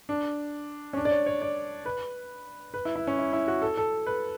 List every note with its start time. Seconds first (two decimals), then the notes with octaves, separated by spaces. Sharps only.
0.09 D4
0.93 C#4
0.97 D4
1.05 D5
1.11 C#5
1.26 C#5
1.42 D5
1.85 B4
2.74 B4
2.85 E4
2.96 E4
3.07 C#4
3.19 E4
3.33 E4
3.48 F#4
3.62 A4
3.77 A4
4.06 B4